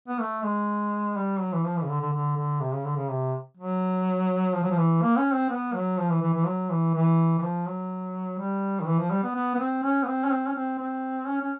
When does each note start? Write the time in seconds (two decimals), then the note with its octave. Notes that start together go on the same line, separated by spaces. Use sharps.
0.08 B3
0.20 A3
0.44 G#3
1.16 G3
1.40 F#3
1.53 E3
1.64 F3
1.77 E3
1.83 C#3
1.89 D3
2.01 D3
2.13 D3
2.37 D3
2.61 C3
2.73 C#3
2.85 D3
2.96 C#3
3.09 C3
3.57 F#3
4.54 F3
4.63 F#3
4.71 F3
4.78 E3
5.02 A#3
5.17 C#4
5.34 C4
5.50 B3
5.74 F#3
5.98 F3
6.10 E3
6.22 E3
6.34 E3
6.46 F#3
6.70 E3
6.94 E3
7.38 E3
7.43 F3
7.67 F#3
8.39 G3
8.81 D#3
8.87 E3
8.99 F3
9.11 G3
9.23 B3
9.35 B3
9.55 B3
9.59 C4
9.83 C#4
10.03 B3
10.07 C4
10.25 C#4
10.32 C4
10.48 C#4
10.56 C4
10.79 C4
11.28 C#4
11.42 C#4